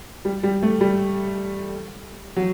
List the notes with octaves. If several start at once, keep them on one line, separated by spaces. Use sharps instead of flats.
G3
G3
A3
G3
F#3